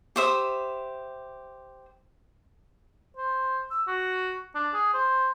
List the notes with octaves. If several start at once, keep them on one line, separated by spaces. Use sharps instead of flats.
G4 C5 E5 D#6
C5
E6
F#4
D4
G#4
C5